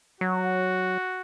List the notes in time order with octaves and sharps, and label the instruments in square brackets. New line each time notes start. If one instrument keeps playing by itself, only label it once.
[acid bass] F#3 [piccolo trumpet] F#4